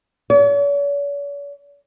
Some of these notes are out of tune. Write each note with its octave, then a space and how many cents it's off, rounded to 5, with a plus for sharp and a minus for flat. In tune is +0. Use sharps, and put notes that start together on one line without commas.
C#5 +45